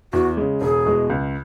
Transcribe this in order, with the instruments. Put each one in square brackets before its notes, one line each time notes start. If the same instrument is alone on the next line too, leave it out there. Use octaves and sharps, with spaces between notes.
[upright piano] E2 [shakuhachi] F#4
[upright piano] C#3 G#3
[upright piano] E1 [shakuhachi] G#4
[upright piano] E2 B2 G#3
C#2